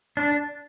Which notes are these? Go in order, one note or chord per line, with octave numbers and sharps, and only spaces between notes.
D4